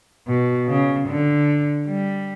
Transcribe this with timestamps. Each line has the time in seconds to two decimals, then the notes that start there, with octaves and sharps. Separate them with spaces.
0.27 B2
0.68 C#3
1.08 D3
1.88 G3